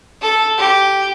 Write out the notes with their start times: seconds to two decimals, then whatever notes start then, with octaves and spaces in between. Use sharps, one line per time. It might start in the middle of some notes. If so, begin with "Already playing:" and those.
0.22 A4
0.58 G4